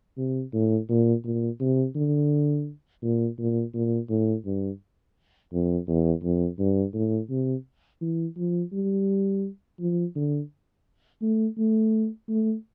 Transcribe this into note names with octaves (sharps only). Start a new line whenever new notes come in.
C3
A2
A#2
A#2
C3
D3
A#2
A#2
A#2
A2
G2
F2
E2
F2
G2
A2
C3
E3
F3
G3
F3
D3
A3
A3
A3